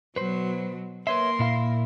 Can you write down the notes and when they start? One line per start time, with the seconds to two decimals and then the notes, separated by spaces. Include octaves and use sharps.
0.16 B2 F#3 B4 C5
1.07 A#3 A#4 B4 C#5 E5 C6
1.39 A#2 E4 F5